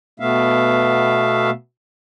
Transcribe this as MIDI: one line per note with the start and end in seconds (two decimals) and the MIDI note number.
0.20 1.50 47
0.20 1.50 57
0.20 1.50 59
0.20 1.50 76
0.20 1.50 77